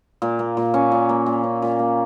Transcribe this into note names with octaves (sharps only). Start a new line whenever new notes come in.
A#2
A#3
A#2
C#4
A#2
A#3
A#2
C#4
A#2
A#3